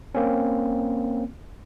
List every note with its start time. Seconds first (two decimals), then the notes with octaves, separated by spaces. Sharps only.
0.15 A#3 C4 C#4